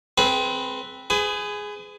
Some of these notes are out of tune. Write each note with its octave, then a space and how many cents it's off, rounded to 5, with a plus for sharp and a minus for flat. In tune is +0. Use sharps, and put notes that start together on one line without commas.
C4 +0 G#4 +30 B4 +0
G#4 +0 B4 +40